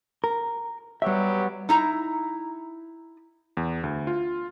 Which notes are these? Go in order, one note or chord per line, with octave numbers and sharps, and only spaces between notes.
A#4
F#3 G3 B3 G4 E5
D#4 E4 A#5
E2
D2
F4